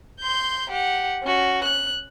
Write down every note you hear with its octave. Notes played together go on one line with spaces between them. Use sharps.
C6 G6
G4 F#5
C#4 F#4
F#6